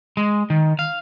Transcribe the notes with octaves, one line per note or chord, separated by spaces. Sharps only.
G#3
D#3
F5